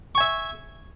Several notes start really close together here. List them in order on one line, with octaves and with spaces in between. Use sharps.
C#6 G#5 E5